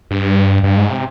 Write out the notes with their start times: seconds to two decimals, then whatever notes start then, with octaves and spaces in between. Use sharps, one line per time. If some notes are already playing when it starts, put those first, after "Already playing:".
0.11 G2
0.63 G2
0.77 G#2
0.90 C3